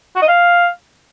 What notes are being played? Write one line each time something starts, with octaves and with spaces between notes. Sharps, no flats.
F#4
D#5
F5